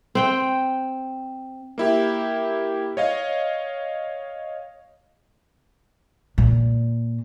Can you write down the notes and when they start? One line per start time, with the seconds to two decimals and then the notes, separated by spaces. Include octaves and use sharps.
0.15 C4 G5
1.78 A#3 E4 G4
2.97 C#5 D#5 F5
6.38 A#2